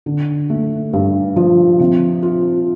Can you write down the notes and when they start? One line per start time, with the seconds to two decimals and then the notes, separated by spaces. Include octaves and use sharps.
0.06 D3
0.50 A3
0.93 G2
1.36 F3
1.79 C3
2.23 F4